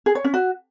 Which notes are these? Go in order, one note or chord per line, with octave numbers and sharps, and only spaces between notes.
G#4
C#5
C#4
F#4